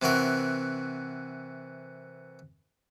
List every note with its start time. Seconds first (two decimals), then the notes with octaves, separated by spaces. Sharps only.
0.02 C3 E3 F#4 A#4